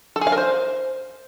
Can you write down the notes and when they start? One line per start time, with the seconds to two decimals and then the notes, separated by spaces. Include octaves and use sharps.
0.16 A4
0.21 G#4
0.27 F5
0.32 A#4
0.38 C5